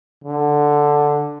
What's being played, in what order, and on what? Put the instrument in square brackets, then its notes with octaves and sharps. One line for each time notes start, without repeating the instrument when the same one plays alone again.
[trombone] D3